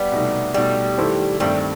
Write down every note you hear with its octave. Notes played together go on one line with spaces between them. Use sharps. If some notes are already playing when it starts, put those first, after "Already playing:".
Already playing: G3 B3
C2 B2 A3 D#4
B2 G3 A3 D#4
D#3 A3 E4 A4 C5
G2 D#3 G3 A3 C4